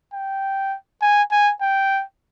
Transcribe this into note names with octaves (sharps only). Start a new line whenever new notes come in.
G5
G#5
G#5
G5